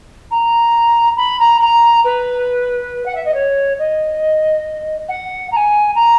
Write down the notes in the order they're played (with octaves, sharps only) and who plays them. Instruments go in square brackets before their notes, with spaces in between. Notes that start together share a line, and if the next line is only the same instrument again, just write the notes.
[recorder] A#5
B5
A#5
A#5
B4
F#5
E5
D#5
C#5
D#5
F#5
A#5
G#5
A#5